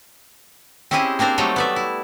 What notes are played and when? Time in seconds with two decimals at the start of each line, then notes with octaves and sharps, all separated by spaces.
0.91 C4 C#4 E4 G4 G#4 D#5
1.19 A#3 C4 D4 A#4 C5
1.38 F#3 G3 A3 A#3 D#4 G5
1.56 B3 D5 E5
1.76 E4